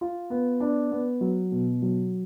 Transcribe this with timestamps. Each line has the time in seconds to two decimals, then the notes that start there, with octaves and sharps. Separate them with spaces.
0.01 F4
0.30 B3
0.60 D4
0.92 B3
1.21 F#3
1.52 B2
1.82 F#3